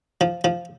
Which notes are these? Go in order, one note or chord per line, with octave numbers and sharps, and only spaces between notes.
F3
F3